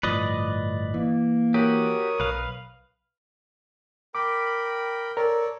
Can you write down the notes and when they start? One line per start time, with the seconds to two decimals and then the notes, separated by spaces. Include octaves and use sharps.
0.03 G1 A2 F3 B4 D5 D#5
0.94 E3 A#3
1.54 F#4 G4 A#4 C#5 D#6
2.20 B1 B4 F5
4.15 A#4 G5 B5 D6
5.17 A4 A#4 C#5 D5